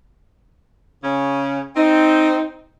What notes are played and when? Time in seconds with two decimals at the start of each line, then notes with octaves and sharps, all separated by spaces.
1.03 C#3 C#4
1.75 C4 D#4